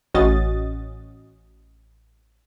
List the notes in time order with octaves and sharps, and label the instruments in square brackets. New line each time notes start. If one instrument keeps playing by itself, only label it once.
[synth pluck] A1 C#4 F#4 D#5 A6